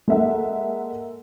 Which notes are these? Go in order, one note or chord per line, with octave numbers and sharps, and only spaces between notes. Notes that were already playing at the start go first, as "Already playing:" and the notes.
G#3 A#3 A4 E5 F#5